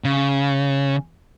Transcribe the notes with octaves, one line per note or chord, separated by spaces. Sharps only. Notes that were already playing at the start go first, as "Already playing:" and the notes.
C#3